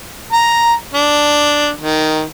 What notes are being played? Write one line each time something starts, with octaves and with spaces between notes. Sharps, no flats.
A#5
D4
D#3